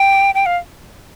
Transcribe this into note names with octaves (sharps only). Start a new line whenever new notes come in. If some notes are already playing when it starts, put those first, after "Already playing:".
Already playing: G5
G5
F5